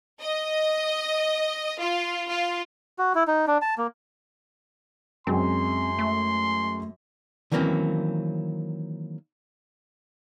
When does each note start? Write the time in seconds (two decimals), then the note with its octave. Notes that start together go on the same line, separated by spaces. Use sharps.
0.21 D#5
1.79 F4
2.29 F4
2.99 F#4
3.15 E4
3.27 D#4
3.47 D4
3.62 A5
3.78 A#3
5.27 F#2 G#3 C4 C6
5.99 A3
7.52 D#3 E3 F#3 A#3 C4 C#4